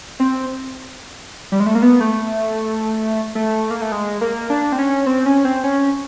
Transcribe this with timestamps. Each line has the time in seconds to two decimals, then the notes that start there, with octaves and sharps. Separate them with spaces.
0.20 C4
1.52 G3
1.60 G#3
1.66 A3
1.75 A#3
1.82 B3
2.00 A3
3.35 A3
3.71 A#3
3.81 A3
3.92 G#3
4.21 A#3
4.50 D4
4.72 C4
4.78 C#4
5.06 C4
5.26 C#4
5.45 C4
5.64 C#4